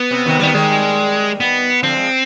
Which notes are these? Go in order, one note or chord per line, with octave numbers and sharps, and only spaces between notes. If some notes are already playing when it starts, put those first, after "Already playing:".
Already playing: B3
C3
C3 D#3
D#3 G3 B3
D#3 G3 G#3
B3
D3 F3 C4
F3 G#3